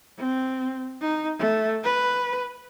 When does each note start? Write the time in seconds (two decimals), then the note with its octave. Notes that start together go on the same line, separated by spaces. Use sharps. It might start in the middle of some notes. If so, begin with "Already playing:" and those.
0.18 C4
1.02 D#4
1.39 A3
1.84 B4